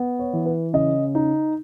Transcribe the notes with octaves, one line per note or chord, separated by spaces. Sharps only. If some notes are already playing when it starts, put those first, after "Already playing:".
Already playing: B3
C#5
E3
B4
C#3 D#5
D#4